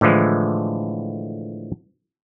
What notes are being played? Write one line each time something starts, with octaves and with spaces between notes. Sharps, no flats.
A2 D3 E3 F3 G#3